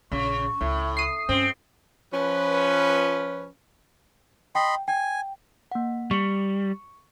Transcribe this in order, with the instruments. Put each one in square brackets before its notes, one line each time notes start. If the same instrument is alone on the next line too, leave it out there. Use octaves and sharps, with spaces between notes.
[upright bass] A#1 [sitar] C#3 [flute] C#6
[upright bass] C#2 [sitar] A2
[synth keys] D#6 C7
[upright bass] G2 [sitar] C4 [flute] C#4
[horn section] F3 C#4 B4
[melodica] D#5 B5 C6 [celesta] G5
[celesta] G5 [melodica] G#5
[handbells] A#3 F#5
[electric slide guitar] G3 [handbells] C#6 C#7